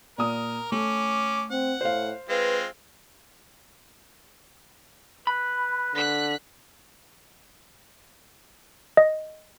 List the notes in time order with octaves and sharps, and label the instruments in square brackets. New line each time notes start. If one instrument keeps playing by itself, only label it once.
[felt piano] A#2 D#6 [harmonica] A#4
[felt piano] A3 [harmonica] C#4 D6
[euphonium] C4 [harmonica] F#5
[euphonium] A2 [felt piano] C5 F5
[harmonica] G#3 C4 F4 [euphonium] B4
[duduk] B4 [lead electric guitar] B5
[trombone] D3 [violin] F#6 B6
[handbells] D#5